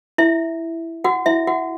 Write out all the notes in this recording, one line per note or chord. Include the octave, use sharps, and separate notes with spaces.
E4 E5
F#4 F#5
E4 E5
F#4 F#5